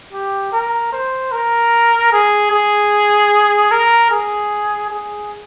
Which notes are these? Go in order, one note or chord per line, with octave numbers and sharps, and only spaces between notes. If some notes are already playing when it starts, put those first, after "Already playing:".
G4
A#4
C5
A#4
G#4
G#4
A#4
G#4
G#4